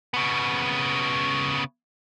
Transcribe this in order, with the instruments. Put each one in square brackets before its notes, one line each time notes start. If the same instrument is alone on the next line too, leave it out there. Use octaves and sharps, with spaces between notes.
[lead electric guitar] C#3 B3